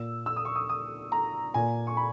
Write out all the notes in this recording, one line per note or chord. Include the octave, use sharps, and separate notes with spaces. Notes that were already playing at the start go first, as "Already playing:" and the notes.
Already playing: A#2 E6
E6
D#6
C#6
D#6
D#6
A#5
A#2 G#5
C#6
B5